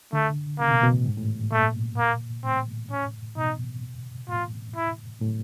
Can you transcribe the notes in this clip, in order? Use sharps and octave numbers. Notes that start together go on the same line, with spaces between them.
D3 A3
C#3 A#3
B2
B2
A2
G#2
A2
A#2 A3
A#3
A2 C4
C#4
B2 D#4
A2 F4
E4
A2